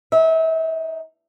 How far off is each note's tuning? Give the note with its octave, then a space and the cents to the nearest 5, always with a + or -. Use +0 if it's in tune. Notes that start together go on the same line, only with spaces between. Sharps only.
D#4 +0 E5 -35